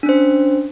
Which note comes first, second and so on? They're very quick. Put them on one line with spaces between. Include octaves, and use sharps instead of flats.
D4 C#4 C5